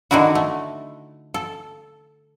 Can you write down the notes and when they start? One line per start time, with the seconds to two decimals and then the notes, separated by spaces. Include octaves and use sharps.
0.11 D3 D#3 D#4 E4 F#4
0.35 A3
1.34 A4